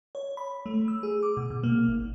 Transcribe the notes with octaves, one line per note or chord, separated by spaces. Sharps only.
C#5
B5
A3
E6
G#4
D6
B2
B2
A#3
G#1